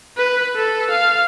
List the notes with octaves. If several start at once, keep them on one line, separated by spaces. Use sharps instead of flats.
B4
A4
F5